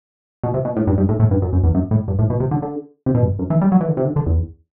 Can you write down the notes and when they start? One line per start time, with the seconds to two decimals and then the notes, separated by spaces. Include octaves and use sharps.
0.44 B2
0.54 C3
0.65 B2
0.76 A2
0.87 G2
0.98 G2
1.09 A2
1.20 A2
1.31 G2
1.42 F#2
1.53 F#2
1.64 E2
1.75 F#2
1.91 A2
2.08 G2
2.19 A2
2.30 B2
2.40 C3
2.51 D3
2.62 D3
3.06 C3
3.15 B2
3.23 G2
3.39 F#2
3.50 E3
3.61 G3
3.72 F#3
3.81 E3
3.88 D3
3.97 C3
4.05 D3
4.16 D3
4.26 E2